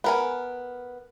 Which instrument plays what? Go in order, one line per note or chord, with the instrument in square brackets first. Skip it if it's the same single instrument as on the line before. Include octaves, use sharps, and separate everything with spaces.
[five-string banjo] B3 A#4 G#5